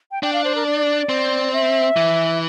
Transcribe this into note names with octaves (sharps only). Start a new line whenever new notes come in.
G5
D4 G5
F5
C5
A#4
D5
C4
E5
E3